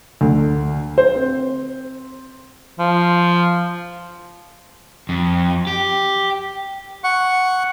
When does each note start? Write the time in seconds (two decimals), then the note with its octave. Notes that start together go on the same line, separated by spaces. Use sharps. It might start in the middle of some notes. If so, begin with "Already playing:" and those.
0.21 D2
0.98 C5
1.16 C4
2.79 F3
5.09 F2
5.67 G4
7.04 F#5 C#6